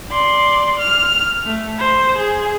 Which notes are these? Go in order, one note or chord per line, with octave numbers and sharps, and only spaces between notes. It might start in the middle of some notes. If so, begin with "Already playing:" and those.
D5 C6
F6
A3
C5
G#4